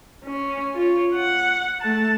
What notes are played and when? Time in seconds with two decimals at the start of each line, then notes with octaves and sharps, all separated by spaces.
0.24 C#4
0.74 F4 C#5
1.15 F#5
1.81 A3 A5